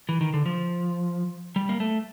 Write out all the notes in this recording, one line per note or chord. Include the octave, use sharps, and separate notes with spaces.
E3
D#3
D3
F3
G3
A#3
A3